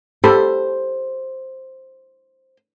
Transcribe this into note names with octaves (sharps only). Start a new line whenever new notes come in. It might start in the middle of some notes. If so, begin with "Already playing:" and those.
G4 A4 C5 B5